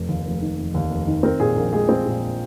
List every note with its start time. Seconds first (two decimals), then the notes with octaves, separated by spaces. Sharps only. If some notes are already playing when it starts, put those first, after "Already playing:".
Already playing: F1
0.09 D#2
0.25 F1
0.41 D#3
0.58 F1
0.74 D#2
0.90 F1
1.07 D#3
1.23 C4 A#4
1.40 A#2 G#4
1.56 A#1 A#4
1.73 G#3 G#4
1.89 C4
2.06 A#2